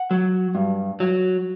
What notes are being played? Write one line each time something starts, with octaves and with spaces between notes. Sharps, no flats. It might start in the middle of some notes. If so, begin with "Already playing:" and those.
Already playing: F#5
F#3
G2
F#3